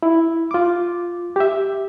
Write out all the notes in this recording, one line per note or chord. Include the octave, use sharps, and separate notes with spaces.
E4
F4 D6
G4 E5